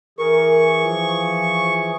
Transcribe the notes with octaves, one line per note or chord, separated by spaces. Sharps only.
E3 G#4 A#4 C#6
F3